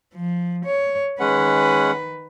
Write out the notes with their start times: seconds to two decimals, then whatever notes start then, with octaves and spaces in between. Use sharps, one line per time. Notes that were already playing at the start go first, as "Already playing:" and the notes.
0.14 F3
0.65 C#5
1.20 D#3 G#3 C#4 B4 F#5